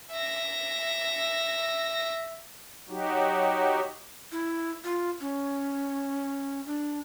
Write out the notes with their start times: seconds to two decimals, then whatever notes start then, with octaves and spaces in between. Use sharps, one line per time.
0.12 E5 A#6
2.89 F#3 D#4 F#4 G4
4.32 E4
4.84 F4
5.21 C#4
6.66 D4